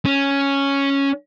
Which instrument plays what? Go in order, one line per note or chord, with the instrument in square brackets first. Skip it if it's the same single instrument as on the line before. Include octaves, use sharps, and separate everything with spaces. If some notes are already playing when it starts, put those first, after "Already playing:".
[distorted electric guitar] C#4